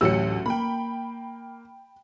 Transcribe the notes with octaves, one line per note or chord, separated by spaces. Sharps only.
A1 D2 F#3 G4 E6 C#7
A#3 G5 B5